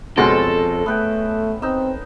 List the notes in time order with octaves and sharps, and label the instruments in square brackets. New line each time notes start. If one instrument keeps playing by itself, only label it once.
[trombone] F2 [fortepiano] B2 G#3 [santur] C4 C#4 [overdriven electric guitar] A4
[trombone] A3 [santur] B3 B4 G5
[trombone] C4 [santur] D#4 E6